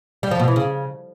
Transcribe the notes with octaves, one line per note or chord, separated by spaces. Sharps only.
G3
F3
B2
E3
C#3